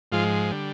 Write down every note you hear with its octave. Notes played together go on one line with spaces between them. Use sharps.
G#2 F3 G#3 F4
D3 G3